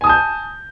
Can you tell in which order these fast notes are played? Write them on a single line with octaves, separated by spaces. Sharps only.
G#5 D#6 A5 G6